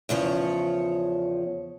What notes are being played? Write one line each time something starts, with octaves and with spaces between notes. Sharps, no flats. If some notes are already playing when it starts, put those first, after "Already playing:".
E2 C#3 F3 C#5